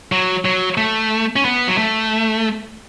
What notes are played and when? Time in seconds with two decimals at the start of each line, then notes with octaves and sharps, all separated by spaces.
0.12 F#3
0.45 F#3
0.78 A3
1.36 C#4
1.45 B3
1.68 F#3
1.78 A3